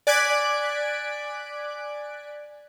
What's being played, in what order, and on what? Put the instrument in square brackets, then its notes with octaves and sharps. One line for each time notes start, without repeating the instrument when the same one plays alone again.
[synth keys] D5 G#5 F#6 G#6 B6 D7